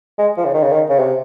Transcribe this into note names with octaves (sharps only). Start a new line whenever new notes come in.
G#3
F3
C#3
D#3
C#3
D#3
C#3
C3